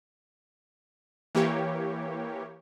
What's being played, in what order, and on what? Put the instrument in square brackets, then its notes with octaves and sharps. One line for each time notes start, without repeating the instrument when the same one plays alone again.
[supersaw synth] E3 A#3 G4 C#5